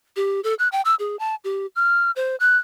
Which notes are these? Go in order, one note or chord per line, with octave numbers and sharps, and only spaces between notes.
G4
A4
F#6
G5
E6
G#4
A5
G4
F6
C5
F#6